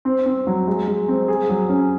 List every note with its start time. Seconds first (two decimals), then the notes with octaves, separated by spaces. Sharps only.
0.05 C4
0.26 C4
0.47 F#3
0.68 G#3
0.87 G#3
1.08 C4
1.28 G#4
1.49 F#3
1.69 C#4